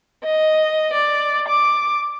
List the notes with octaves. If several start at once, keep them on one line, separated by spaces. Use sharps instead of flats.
D#5
D5
D6